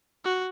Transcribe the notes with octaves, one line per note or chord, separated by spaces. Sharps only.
F#4